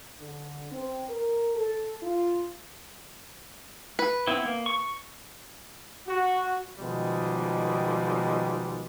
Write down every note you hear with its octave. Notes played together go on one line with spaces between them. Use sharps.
D3
C4
A#4
A4
F4
B4
B3 C4 E4
A#3
C#6
F#4
B2 D#3 F3 G3 G#3